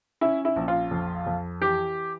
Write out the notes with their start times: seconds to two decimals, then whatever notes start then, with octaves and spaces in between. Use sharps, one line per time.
0.21 C#4 E4
0.45 E4
0.56 A#1
0.68 F4
0.91 F2
1.26 F2
1.61 E3 G4